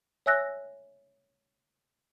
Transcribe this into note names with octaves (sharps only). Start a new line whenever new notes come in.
C#5 E5 G#5 E6 F#6 A#6